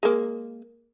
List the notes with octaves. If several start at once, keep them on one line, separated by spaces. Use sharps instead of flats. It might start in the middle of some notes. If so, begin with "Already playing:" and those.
G#3 A#3